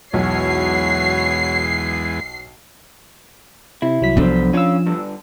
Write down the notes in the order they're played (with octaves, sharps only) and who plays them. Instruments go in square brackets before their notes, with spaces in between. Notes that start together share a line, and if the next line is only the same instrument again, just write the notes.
[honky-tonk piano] B1 [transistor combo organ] E2 G#3 B3 [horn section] E4 F#4 C#5 [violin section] C7
[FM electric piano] C3 [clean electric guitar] E4
[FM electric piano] C2 F#3 B6
[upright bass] F3 D4 [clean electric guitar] B3 A4 C5
[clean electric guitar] C#4 C#5 F5 [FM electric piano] F4 E6
[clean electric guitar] G2 D3